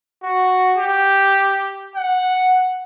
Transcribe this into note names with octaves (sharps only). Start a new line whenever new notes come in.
F#4
G4
F#5